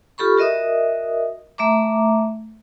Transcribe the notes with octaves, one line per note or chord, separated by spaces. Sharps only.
F4 G4 A4 B5 C#6
F#4 A#4 D#5 E5 D#6
A3 E5 A#5 D6